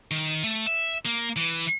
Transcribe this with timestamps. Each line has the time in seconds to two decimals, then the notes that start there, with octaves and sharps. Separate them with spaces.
0.11 D#3
0.43 A3
0.66 E5
1.05 A#3
1.36 E3